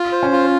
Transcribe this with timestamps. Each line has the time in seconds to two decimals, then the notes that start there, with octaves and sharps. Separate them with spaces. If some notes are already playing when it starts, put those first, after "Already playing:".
Already playing: F4
0.12 C5
0.23 C#4
0.32 F4